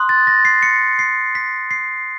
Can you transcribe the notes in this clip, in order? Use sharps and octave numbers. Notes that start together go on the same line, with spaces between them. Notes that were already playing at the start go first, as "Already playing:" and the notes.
Already playing: C6 D#6 F#6
A6
A#6
C7
C#7
C7
B6
C7